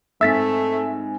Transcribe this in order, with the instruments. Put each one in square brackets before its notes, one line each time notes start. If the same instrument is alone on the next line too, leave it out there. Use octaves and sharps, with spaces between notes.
[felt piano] G#2 C4 G#5 [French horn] A3 [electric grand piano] E5 [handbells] E6 A6 B6